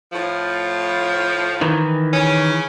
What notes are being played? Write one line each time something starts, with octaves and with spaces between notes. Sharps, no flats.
A2 F3
D#3 E3
C#3 C#4